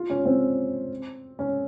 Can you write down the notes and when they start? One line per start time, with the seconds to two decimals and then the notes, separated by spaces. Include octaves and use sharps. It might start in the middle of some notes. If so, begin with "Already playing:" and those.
Already playing: F4
0.10 C#4
0.25 C4
1.39 C#4